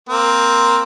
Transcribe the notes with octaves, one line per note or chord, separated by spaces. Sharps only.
A#3 C4